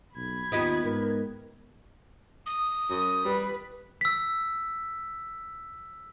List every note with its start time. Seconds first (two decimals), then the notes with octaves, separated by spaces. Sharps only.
0.16 B1 B5 G#6
0.52 D#2 B3 D#4 F4 G4
0.84 G#2 A#4
2.46 D#6
2.90 F#2
3.25 G3 B4
4.01 E6 B6